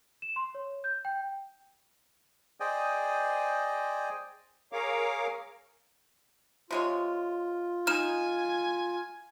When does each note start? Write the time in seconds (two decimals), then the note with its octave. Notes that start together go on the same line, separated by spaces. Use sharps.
0.22 E7
0.36 C6
0.55 C#5
0.84 G6
1.05 G5
2.60 G#4 C5 D5 D#5 G5 G#5
4.73 G#4 A#4 C#5 F5 D6
6.71 C3 G#3 F4 C#5
7.87 D#4 G#5 F6 E7